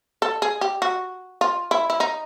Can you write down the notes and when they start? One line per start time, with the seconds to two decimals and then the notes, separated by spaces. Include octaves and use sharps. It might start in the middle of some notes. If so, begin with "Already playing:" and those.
0.22 A4
0.42 G#4
0.61 G4
0.82 F#4
1.41 F4
1.71 E4
1.90 E4
2.00 D#4